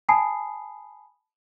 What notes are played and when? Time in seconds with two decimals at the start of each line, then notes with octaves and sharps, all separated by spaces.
0.09 G#5 A5 B5 D#6 C7